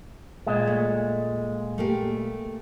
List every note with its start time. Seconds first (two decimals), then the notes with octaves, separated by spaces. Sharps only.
0.47 A#2 G#3
0.67 A3
1.78 A3 A#3 G4